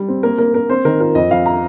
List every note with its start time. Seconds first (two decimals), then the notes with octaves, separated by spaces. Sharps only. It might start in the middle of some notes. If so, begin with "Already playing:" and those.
Already playing: G3
0.08 C4
0.23 A#3 A#4
0.38 A#3 A#4
0.54 A#3 A#4
0.69 C4 C5
0.85 D#3 A#4
1.00 F4 A#4
1.15 F2 D#5
1.31 F2 F5
1.46 A#5